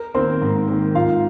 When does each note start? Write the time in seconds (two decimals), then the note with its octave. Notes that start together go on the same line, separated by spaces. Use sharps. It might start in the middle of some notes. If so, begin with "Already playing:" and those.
Already playing: A#4
0.14 D#3 A#3 C4 C5
0.41 G#2
0.68 D#3 A#3
0.95 G#2 F4 F5